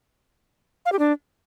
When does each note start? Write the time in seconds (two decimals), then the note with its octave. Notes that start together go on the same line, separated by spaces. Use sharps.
0.85 F5
0.92 G4
0.99 D4